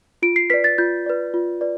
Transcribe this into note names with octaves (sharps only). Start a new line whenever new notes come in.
F4 D7
C7
B4 D5 B6
A6
F4 G6
B4 D5
F4
B4 D5